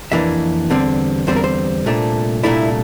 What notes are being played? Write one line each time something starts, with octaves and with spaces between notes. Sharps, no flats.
F2 E3 A#3 D4 E5
E2 D3 G3 C4
E2 D3 G3 C4 C5
A#4
C5
C2 A#2 A3 D4
C2 A#2 A3 D4 E4